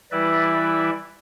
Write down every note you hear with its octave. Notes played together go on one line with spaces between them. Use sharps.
E3 G3 E4 B4 D5 E5